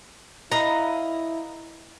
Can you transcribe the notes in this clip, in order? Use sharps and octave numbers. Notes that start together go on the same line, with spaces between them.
E4 B4 D#5 F5 A#5